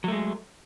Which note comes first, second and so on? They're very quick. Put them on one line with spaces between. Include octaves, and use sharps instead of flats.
F#3 A3 G#3